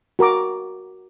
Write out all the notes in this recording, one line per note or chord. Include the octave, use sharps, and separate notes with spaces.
F#4 A#4 A#5 D6